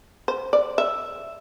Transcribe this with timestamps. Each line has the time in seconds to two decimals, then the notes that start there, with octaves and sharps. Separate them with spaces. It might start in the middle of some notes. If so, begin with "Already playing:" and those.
0.28 C5
0.53 D5
0.78 E5